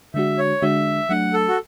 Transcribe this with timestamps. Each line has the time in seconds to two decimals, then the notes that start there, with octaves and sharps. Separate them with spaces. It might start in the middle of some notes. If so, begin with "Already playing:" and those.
0.14 D3 G#3 D4 F#4 E5
0.38 C#5
0.62 D3 G#3 D4 F#4 E5
1.09 F#3 A3 D4 F#5
1.34 A4
1.48 F#4